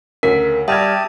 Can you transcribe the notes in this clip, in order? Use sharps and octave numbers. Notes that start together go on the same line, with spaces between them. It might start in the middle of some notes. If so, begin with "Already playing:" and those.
D2 C#3 A#4 B6
G3 G4 E5 G5 A5 D#6 F6 G#6